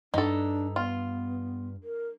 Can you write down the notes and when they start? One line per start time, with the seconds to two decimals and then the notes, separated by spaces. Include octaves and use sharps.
0.14 G2 D4 D#4 A4
0.76 B3 F4
1.83 A#4